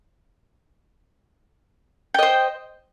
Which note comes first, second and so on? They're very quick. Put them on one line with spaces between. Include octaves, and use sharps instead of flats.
G5 D#5 C5